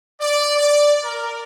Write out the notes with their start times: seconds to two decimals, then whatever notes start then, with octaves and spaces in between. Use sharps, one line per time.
0.21 D5
0.58 D5
1.04 A#4